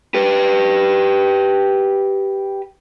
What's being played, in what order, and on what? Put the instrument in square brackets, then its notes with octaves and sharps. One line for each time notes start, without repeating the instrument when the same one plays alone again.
[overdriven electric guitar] G4 B4